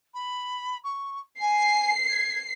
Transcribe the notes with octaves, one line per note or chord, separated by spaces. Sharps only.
B5
C#6
G#5 C7
G#6